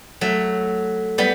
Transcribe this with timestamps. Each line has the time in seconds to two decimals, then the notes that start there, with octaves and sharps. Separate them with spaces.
0.21 F#3 A3
1.18 G3 B3